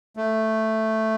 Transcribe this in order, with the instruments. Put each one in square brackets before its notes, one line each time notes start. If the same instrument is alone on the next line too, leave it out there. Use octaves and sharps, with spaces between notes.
[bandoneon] A3